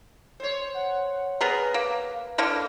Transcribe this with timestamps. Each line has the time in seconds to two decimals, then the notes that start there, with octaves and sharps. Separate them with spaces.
0.40 C5 C#5
0.74 F#5
1.41 B3 G#4 A#4 B4
1.74 A#3
2.38 D3 E3 A#3 F6